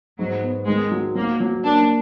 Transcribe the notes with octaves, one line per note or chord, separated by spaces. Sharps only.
G#2 F#3
B3
D#3 G#3
F#3
F#3 A#3
F#3
A#3 D4